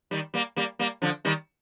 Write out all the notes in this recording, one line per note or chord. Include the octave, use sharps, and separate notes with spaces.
D#3 G3
G3 A#3
G3 A#3
G3 A#3
D3 F3
D#3 G3